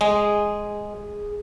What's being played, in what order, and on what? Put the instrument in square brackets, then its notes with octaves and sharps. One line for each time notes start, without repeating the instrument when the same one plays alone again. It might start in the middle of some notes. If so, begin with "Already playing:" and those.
[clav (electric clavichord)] G#3 [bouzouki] G#4